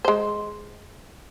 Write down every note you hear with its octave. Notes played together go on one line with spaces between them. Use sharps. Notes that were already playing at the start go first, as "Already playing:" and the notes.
G#3 C5